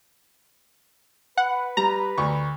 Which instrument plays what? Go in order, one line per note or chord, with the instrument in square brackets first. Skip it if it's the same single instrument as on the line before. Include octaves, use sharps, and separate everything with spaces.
[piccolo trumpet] B4 [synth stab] F#5
[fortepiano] G3 [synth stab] A#5
[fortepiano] D2 C#6